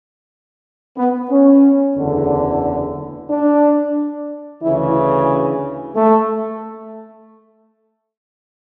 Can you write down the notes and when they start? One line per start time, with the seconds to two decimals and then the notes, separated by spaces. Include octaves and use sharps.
0.98 B3
1.30 C#4
1.97 F#1 E2 D3
3.30 D4
4.62 D2 C#3 E3 E4
5.96 A3